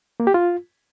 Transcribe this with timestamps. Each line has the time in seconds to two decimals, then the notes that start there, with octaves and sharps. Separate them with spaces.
0.20 A#3
0.27 G4
0.34 F4